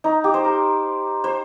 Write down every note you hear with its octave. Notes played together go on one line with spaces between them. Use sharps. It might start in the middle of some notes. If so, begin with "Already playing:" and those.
D#4
G4
C5
A#4
C5